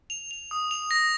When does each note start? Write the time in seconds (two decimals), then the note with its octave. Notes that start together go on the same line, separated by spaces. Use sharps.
0.10 F7
0.31 F7
0.51 D#6
0.71 F7
0.91 A#6